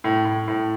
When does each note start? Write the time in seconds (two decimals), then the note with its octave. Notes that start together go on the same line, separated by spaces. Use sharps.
0.04 A2
0.25 A2
0.48 A2